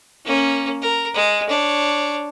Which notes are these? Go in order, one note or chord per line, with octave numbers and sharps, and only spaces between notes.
A#3 C#4
A#4
G#3
D4 C#5